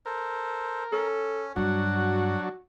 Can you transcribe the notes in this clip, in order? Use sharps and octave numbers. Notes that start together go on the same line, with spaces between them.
A4 A#4 C5
C#4 A4
G2 F#3 D4 F#4 F#5